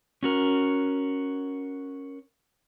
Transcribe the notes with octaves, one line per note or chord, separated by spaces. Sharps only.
C#4 F#4 A#4